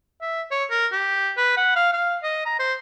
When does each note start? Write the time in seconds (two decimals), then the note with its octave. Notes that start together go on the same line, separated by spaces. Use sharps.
0.21 E5
0.51 C#5
0.70 A#4
0.92 G4
1.37 B4
1.56 F#5
1.76 F5
1.93 F5
2.23 D#5
2.46 A#5
2.59 C5